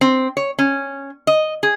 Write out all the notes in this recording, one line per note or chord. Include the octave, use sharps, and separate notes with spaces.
C4
C#5
C#4
D#5
G#4